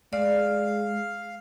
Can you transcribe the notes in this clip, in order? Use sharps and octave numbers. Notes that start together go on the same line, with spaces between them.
G#3 D5 F5